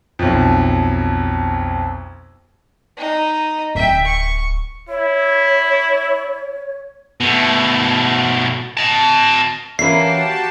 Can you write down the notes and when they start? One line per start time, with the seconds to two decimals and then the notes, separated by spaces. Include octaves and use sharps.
0.19 B1 F2
2.97 D#4 D#5
3.75 D1 E5 G5
4.05 C#6
4.89 E4 C#5
7.20 B2 A3
8.77 D#5 A5
9.79 E3 A#3 C#4 F#4 G4 E5 A5 C7